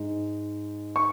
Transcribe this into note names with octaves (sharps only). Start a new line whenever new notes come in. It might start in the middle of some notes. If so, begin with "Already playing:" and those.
Already playing: G#2 G#3 D#4
C#6